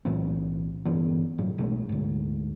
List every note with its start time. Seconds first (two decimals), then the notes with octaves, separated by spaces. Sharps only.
0.05 B1 A2 E3 C4
0.85 G1 G2 E3 B3
1.38 G1 A2 F#3
1.58 B1 B2 G#3 A3
1.89 D2 G#2